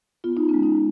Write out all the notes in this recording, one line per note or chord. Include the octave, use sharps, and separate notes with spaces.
B3 F4
D#4
G#3 C#4
D#4